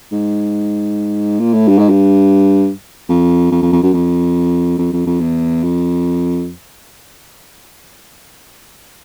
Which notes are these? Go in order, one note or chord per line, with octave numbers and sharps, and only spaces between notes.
G#2
A#2
A2
G2
G#2
G2
F2
F2
F2
F2
F#2
F2
F2
F2
F2
E2
F2